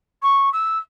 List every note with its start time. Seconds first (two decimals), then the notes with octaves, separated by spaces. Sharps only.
0.22 C#6
0.53 E6